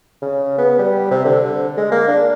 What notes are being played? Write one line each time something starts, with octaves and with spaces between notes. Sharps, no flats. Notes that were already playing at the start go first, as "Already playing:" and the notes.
C#3
B3
G3
C3
D3
G#3
A#3
D4